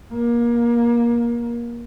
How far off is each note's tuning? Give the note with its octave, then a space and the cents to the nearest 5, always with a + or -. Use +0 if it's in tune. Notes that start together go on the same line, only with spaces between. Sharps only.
A#3 +25